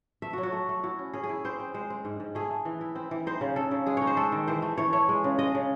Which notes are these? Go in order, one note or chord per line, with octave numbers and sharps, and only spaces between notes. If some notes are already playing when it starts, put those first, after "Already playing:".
A3 E5
F#4
F#3
F#4
A3
A3
E4 F#4
C#4
C#4 G#4
G#4
E4
C4 C5
C4
G#3 C5
C4
G#2
G#2
A3 G#4
A3
E3
E4
C4
E3
D#4 C5
C#3
C#3 A4
C#3
G#3 G#4
D#4 C#5
C5
G#3 A4
D#3
E3 C5
A3
E3 C#5
A3 C#5
G#3
C#3
G#3 D#5
C#3